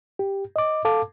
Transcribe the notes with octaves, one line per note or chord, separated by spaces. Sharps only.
G4
D#5 D6
A4 F5 A5 D6